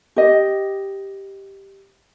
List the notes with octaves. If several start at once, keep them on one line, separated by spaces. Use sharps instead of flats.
G4 D#5